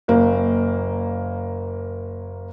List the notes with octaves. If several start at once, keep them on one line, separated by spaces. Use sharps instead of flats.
F#1 A#3